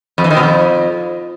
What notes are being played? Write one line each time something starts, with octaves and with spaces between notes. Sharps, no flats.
F2
E3
D#3
B2
F2